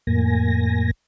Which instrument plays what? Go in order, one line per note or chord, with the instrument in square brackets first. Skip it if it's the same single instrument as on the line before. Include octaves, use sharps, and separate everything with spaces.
[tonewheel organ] F2 A2 A#3 G#5 A#6